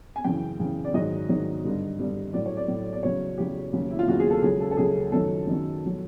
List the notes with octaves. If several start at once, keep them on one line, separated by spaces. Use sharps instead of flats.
G#5
F#2 C#3 E3 G5
F#2 C#3 E3
D5
G#2 D#3 F#3 D#5
G#2 D#3 F#3
G2 D3 G3
G2 D3 G3
A2 F#3 D5
C#5
D5
A2 F#3
D5
E2 C#3 F#3 C#5
E2 C#3 F#3 G4
D#2 C#3 F#3
E4
F4
D#2 C#3 F#3 F#4
G#4
A4
C#2 C#3 F#3 G#4
A4
A4
C#2 C#3 F#3 G#4
F#2 D#3 F#3 A4
F#2 D#3 F#3
E2 B2 F#3